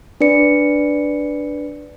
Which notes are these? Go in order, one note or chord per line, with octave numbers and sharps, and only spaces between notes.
D4 B4 D5 C#7